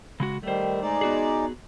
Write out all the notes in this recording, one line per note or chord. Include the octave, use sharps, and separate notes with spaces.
C#3 G#3 F#4
D#3 G3 A3 C5
G#3 D#4 D5
B3 F#4 G#4